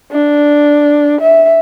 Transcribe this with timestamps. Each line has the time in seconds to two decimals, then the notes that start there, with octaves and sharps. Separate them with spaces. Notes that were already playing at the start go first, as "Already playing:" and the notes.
0.12 D4
1.21 E5